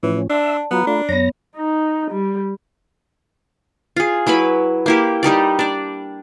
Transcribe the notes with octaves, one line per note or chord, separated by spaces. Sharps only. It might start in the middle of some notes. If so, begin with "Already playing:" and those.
A2 E3 F3 C#4
D4 D5 E5 A5 C6 E6
F#3 B3 F4 A#5 B5
A3 D4 F4
F#2 B3 C#5 A#5 A#6
D#4
G3
F4 G#4
F#3 E4 B4 B5
A#3 E4 G4
G3 D#4 G4 D5
D4 D5